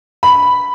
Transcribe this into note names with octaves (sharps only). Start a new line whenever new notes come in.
B5